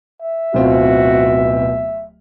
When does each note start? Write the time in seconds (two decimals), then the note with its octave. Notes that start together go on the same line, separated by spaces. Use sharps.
0.22 E5
0.54 D1 B2 C4 F4 F#4